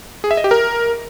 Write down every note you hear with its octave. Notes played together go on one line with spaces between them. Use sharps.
G#4
E5
D#5
G4
A#4